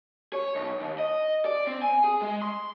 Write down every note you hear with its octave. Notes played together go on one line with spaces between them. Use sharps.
C#5
B1
D#2
D#5
D5
C4
G#5
G#4
G#3
C6